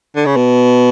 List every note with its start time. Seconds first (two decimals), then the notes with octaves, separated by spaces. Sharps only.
0.16 D3
0.26 C#3
0.36 B2